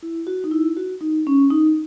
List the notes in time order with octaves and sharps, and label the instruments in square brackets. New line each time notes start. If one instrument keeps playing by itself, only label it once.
[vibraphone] E4
F#4
D#4
E4
F#4
D#4
C#4
D#4